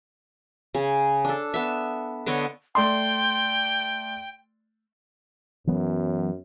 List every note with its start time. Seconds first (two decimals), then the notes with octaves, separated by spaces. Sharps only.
0.75 C#3 G#4
1.25 D4 A4
1.54 B3 E5
2.26 D3 B3 C#5 D#5
2.75 A3 D5 G5 C6
5.67 F#2 E3 F#3 B3